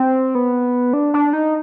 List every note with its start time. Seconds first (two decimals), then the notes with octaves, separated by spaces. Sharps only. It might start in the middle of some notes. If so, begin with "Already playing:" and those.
Already playing: C4
0.35 B3
0.93 D4
1.14 D4
1.33 D#4